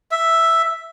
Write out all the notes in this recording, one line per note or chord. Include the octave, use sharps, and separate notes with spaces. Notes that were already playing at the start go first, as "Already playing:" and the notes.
E5